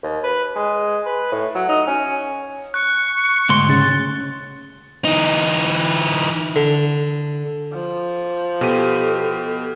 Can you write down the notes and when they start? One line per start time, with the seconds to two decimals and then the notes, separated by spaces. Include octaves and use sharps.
0.03 D#2
0.24 B4
0.56 G#3
1.06 B4
1.32 A2
1.55 F#3
1.69 D#4
1.87 C#4
2.74 C#6 F#6
3.49 D2 G#2 C6
3.69 C#3 A6
5.05 E3 D#4
6.56 D3
7.74 F3
8.61 B2 G4 A4 D#7